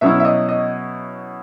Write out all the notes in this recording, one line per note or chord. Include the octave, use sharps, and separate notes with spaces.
B2 F#3 C#4 E4 E5
E5
D#5
D#5